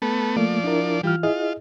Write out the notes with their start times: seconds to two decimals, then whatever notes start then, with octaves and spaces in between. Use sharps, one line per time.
0.02 A3 B3
0.36 F3 A3 A#3 D5
0.64 D4 E4 A#4
1.03 E3 G3 F4 F6
1.23 E4 F4 G#4 D#5